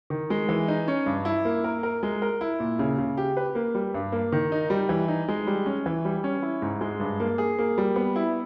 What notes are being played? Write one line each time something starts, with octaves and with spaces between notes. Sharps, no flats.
D#3
G#3
E3
D#4
C#4
G2
E4
A#3
A#4
A#4
G#3
A#4
E4
A#2
C#3
C#3
G4
B4
A#3
G3
G2
A#3
D#3
D#4
G3
E3
D#4
G#3
G3
C#4
E3
G3
C#4
E4
G#2
G#3
G2
A#3
G#4
A#3
G3
B3
E4